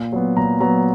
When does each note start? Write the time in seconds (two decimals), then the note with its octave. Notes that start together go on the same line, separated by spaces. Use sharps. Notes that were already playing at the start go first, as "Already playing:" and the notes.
Already playing: A#2 C6
0.12 F#3 B3
0.37 A#2 A#5
0.60 F#3 B3 A#5